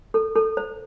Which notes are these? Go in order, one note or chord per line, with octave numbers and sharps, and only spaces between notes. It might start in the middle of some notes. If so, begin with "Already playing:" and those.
A4
A4
C5